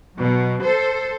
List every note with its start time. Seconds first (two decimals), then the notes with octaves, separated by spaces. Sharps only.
0.17 B2 F#3
0.64 A4 C5